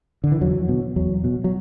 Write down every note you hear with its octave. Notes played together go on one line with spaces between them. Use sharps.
D3
E3
E2 F#3
B2
E2 F#3
B2
F#3